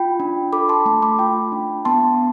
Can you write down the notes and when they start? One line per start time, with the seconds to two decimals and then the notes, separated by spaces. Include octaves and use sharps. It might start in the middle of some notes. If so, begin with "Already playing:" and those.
Already playing: F4 G5 B5
0.20 D4
0.53 A4 B5 D6
0.69 A5 C6
0.86 A3 A5 C6
1.02 B5 D6
1.19 F4 G5 B5
1.52 D4
1.85 B3 A5 C6